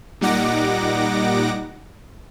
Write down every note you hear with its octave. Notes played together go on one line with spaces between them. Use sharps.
A#2 G3 D#4 F#5 D6 A#6